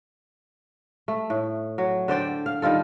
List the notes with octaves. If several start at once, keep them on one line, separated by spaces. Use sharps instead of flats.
A3
A2
F#3
D3 C5 D5 G5
F5
D#3 G3 F4 A4